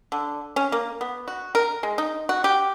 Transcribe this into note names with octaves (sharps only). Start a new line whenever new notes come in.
D3
C#4
A#3
B3
F#4
A#4
G#3
D#4
F#4
G4